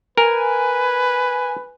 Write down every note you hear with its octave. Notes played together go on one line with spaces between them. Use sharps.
A#4 B4 G#5